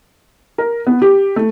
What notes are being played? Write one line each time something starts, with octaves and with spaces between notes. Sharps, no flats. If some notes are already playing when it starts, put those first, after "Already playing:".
A#4
B3
G4
A3